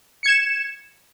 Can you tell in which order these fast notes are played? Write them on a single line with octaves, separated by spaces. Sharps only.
C#7 G#6 E7